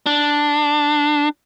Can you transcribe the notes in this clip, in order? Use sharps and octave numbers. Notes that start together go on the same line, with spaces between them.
D4